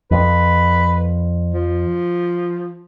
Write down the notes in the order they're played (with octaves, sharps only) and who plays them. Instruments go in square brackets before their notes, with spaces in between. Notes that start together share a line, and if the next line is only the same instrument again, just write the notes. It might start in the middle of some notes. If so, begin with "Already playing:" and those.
[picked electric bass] F2 [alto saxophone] B4
[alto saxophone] F3